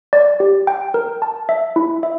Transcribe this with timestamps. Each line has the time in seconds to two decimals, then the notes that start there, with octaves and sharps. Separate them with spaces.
0.13 D5
0.40 G4
0.67 G5
0.94 A#4
1.22 A5
1.49 E5
1.76 E4
2.03 E5